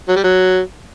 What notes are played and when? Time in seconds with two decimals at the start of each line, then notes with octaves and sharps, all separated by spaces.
0.08 F#3
0.16 G3
0.24 F#3